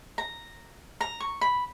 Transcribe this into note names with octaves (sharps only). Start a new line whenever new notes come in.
A#5
A#5
C#6
B5